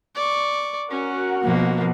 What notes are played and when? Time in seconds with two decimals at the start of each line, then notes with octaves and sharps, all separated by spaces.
0.15 D5 C#6
0.91 C#4 F#4 A#4 F#5
1.44 B2 F3 A#3